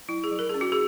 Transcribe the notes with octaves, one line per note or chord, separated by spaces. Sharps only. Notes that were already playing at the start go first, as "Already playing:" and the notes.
F#3 E4
G#4
F#3
A#4
C#4 G#4
F#4
G#4